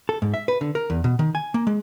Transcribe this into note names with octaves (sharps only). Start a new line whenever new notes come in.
A4
G#2
E5
B4
D3
A#4
E2
B2
D#3
G#5
A#3
G#3